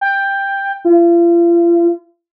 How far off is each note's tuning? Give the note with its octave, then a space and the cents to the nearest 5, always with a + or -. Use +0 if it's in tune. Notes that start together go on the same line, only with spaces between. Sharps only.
G5 +10
F4 -40